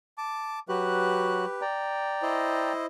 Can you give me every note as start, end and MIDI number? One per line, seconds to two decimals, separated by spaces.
0.18 0.59 81
0.18 0.59 86
0.69 1.45 54
0.69 1.45 66
0.69 1.62 67
0.69 1.62 71
0.69 1.45 90
1.61 2.73 74
1.61 2.73 79
1.61 2.73 82
2.22 2.86 64
2.22 2.86 72
2.22 2.86 75